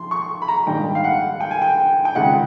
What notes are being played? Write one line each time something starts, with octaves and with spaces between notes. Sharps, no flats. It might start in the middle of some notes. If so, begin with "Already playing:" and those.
Already playing: F2 C6
C#6
B5
A#5
A#1 G#2 D#3 G3 G5
F5
F#5
G5
G#5
G5
G5
C#2 C3 D#3 G#3 C#4 F#5